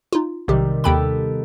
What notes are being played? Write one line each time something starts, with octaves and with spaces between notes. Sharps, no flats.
D#4 F4
B1 C3 D#3 G3 G4
D#2 B3 G4 A4 G5 B5